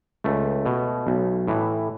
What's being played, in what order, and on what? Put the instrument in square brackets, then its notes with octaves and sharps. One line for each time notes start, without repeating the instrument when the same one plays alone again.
[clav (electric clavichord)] C#2 A3
B2
B1
A2 E3